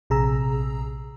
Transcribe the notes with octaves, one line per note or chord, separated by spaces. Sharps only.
A#1 C3 G#4 A#5 E6